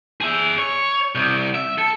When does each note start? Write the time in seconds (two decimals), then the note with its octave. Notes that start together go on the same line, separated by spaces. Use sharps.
0.21 G#4 E5
0.58 C#5
1.15 C2
1.55 E5
1.78 A4